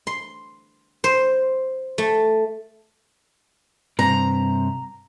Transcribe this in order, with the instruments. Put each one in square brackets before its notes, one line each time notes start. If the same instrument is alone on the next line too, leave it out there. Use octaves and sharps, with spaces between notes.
[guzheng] C6
C5
A3
[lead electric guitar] G2 C3 [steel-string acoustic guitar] A#5